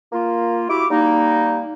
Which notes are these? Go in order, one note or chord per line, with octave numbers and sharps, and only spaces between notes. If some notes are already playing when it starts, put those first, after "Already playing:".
A#3 F4
E4 F#4 G4 D6
G3 A#3 D#4